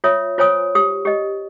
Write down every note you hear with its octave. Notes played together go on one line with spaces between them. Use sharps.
F4 C#5 E5 D#6
F4 C5 C#5 G#5 D#6
G4 D#6
G4 D#5